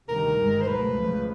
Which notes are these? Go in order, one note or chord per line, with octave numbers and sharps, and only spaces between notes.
D2 C3 D#3 G3 A#4
G1 G2 D#3 G#3
C5
C#2 B2 F#3 A3 B4
C#2 C#3 F3